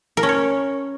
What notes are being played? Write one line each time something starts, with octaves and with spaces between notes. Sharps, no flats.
A#4
C#4
C#5